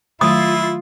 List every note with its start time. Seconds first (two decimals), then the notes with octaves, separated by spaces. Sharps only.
0.21 D#3 F#3 A3 E4 F4 D#6